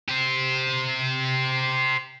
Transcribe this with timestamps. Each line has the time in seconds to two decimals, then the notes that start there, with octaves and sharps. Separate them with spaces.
0.08 G4 C5